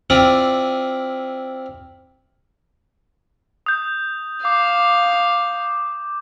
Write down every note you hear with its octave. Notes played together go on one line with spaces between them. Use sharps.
C4 E4 F4 D5 D#6
D#6 G6
F5 D6